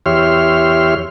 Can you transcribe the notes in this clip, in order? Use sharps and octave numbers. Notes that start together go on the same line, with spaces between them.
E2 G4 C#5 E5 C6 F6